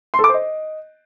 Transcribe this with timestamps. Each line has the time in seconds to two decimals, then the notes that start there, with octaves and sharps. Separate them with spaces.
0.14 C6
0.19 A4
0.24 D6
0.29 C5
0.34 D#5